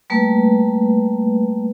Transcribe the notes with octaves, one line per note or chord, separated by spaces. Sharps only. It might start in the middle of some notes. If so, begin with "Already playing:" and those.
G3 A3 A#3 B4